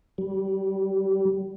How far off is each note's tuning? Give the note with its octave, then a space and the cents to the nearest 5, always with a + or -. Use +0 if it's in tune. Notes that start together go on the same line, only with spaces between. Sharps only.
G3 -25